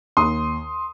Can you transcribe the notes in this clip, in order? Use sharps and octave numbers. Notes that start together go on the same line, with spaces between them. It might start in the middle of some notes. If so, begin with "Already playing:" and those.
D#2 C6 D#6